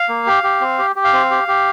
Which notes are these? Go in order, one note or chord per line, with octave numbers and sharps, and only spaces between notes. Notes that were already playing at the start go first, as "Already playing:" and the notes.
Already playing: F5
A#3
G4
G4
C4
G4
G4
F5
C4
G4
G4